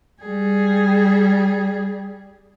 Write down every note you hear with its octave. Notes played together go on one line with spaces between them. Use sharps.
G3 G#4